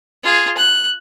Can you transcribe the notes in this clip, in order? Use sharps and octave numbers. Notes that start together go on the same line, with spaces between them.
F4 G#4
F#6